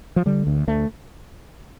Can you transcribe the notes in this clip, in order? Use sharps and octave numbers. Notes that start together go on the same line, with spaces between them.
F3
D3 G3
D2
D2 A3